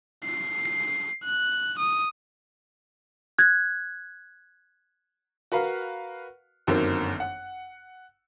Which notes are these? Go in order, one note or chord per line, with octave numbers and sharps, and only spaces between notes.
C7
F#6
D#6
F#6 G#6
F#4 A#4 B4 F5
G1 F#2 D#3 A#3 C4
F#5